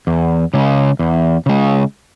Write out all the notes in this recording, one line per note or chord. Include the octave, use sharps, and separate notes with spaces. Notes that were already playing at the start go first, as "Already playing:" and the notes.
E2
C#3 G#3
E2
C#3 G#3